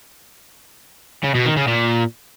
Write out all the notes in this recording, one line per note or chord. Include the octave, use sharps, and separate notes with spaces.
C#3
B2
D#3
C#3
A#2